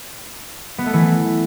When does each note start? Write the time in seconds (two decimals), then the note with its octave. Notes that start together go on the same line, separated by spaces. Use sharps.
0.78 B3
0.86 A3
0.94 E3